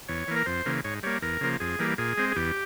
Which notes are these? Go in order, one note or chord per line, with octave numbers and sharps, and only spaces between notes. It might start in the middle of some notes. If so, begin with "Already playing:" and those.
E2 C#5
E3 A#3
A#4
F2 C5
C#3 E3 A#3
G#2 C#5
G3 A#3 C#5
E2 A#4
C#3 F3 A#3
F2 G#4
E3 G3 A#3
A#2 G#4
G#3 C4
G#4
E2 G4